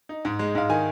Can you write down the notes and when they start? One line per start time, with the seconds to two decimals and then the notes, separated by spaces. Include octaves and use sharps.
0.09 D#4
0.25 G#2
0.39 G#3
0.55 G#2 F5
0.69 D#3 G#5